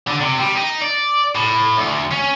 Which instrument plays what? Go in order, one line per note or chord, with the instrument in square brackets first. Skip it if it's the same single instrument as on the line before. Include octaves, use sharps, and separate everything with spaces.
[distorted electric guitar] D3
C3
G3
D#4
D5
A2
D2
C#4